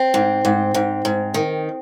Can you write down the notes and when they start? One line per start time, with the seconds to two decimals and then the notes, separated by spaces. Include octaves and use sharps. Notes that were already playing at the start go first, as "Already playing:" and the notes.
Already playing: C4
0.14 G#2
0.45 G#2
0.74 G#2
1.05 G#2
1.34 D#3